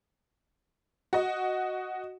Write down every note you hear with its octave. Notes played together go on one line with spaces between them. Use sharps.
F#4 D#5